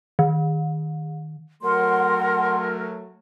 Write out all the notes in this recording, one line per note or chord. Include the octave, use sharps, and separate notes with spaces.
D#3
F#3 A3 A#4 F#5 C6